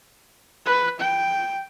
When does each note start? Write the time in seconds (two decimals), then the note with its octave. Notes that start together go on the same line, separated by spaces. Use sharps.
0.66 B4
1.00 G5